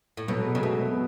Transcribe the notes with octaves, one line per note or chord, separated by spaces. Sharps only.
A2
B2 F#3
G#3
C#3
B2 A3
B3